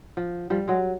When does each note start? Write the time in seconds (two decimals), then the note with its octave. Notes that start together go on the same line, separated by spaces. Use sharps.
0.17 F3
0.50 F3 G3
0.68 F#3 G#3